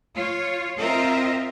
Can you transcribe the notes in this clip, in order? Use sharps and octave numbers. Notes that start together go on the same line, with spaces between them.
F4 C#5
C4 F4 A#4 D#5 E5